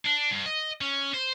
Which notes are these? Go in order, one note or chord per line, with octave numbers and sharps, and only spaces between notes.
D4
G2
D#5
C#4
C5